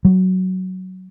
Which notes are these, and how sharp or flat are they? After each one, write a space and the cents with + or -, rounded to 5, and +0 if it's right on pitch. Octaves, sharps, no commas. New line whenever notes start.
F#3 +10